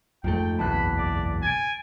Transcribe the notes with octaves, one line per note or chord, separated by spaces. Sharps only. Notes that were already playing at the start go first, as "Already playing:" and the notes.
F2 G#2 A3 G5
F#1 B1 E2 A5 B5 F#6 B6
D5
G#5 A6 D7